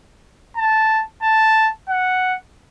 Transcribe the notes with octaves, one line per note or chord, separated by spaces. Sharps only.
A5
A5
F#5